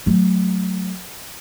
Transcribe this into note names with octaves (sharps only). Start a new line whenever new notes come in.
F#3 A3